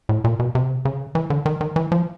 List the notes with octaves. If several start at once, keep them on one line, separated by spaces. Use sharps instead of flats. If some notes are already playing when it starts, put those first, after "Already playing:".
A2
A#2
B2
C3
C#3
E3
D3
D#3
D#3
E3
F3